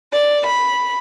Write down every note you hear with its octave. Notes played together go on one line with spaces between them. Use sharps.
D5
B5